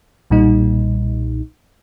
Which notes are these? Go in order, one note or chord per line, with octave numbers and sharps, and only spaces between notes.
B1 A#2 G3 D#4